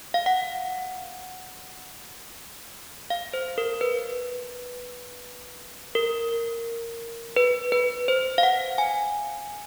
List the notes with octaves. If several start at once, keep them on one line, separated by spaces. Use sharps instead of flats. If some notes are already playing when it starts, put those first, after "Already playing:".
F5
F#5
F5
C5
A#4
B4
A#4
B4
B4
C5
F5
F#5
G#5